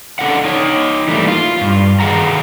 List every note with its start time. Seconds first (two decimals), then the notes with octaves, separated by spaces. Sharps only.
0.19 C#4 D4 A4 D#5 F5 F#5
0.45 D#4 C#5
1.08 E3 G3 A3 A#3
1.28 F4
1.61 G2
2.00 D#3 G#4 F5 F#5 A#5